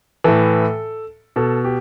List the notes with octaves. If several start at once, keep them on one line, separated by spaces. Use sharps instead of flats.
A2 E3 A4
B2 A4
G4